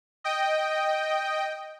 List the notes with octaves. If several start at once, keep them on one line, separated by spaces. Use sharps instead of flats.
D#5 G5